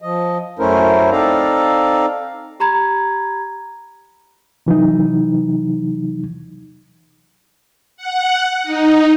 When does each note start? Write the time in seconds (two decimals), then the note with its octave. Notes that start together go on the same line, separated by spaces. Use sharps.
0.02 F3 D#5
0.59 F#2 A3 C#4 E4 A#4 C5
1.11 C4 D#4 A4 D5 F5 A#5
2.60 G4 A#5 B5 G#6
4.66 C3 E3 F#3 D#4
7.97 F#5
8.64 D#4